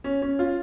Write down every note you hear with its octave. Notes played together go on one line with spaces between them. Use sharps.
C#4
C#4
F4